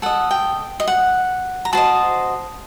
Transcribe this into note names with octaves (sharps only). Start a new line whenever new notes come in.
A4 D#5 F#5
G5
D#5
F#5
A#5
F#4 C5 D#5 A5